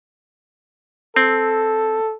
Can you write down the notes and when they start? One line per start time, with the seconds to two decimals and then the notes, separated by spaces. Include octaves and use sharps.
1.16 C4 A4